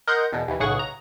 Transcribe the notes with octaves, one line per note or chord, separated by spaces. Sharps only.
A#4 D#5 F#5 C6 G6
E2 B2
D#2 E3
B1 A2 C#3 G#4 F#5 C#6
A#5